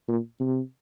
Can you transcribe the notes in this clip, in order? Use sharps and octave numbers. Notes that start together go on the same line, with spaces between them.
A#2
C3